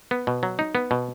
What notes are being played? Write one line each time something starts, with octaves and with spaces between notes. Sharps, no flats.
B3
B2
F#3
D#4
B3
B2